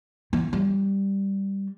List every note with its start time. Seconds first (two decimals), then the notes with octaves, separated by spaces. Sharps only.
0.33 E3
0.53 G3